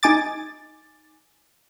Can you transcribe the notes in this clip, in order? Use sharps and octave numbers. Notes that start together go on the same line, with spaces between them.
D#4 G#5 D6 A6